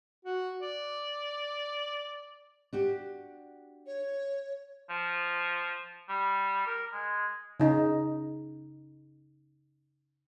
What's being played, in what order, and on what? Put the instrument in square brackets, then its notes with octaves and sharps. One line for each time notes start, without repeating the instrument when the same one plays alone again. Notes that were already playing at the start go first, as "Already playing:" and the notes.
[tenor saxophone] F#4
D5
[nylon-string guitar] D4 F#4 G4
[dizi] C#5
[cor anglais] F3
G3
A#4
G#3
[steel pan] C#3 D#4